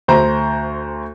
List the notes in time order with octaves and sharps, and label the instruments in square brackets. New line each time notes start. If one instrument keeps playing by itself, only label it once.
[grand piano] D2 C5 A#5